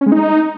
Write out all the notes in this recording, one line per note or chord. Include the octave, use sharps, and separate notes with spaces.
C#4
G#3
D#4